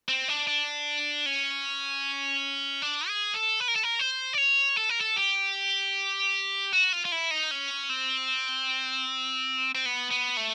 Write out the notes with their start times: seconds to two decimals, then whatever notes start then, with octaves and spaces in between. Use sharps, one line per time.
0.09 C4
0.28 D4
0.47 D4
1.26 C#4
2.82 D4
3.08 G#4
3.34 A4
3.60 B4
3.68 A#4
3.76 A4
3.83 A#4
3.99 C5
4.33 D5
4.38 C#5
4.77 A4
4.89 A#4
5.01 A4
5.16 G4
6.73 F#4
6.93 F4
7.05 F4
7.12 E4
7.31 D#4
7.51 C#4
7.90 C4
9.75 C4
9.86 B3
10.11 B3
10.37 A3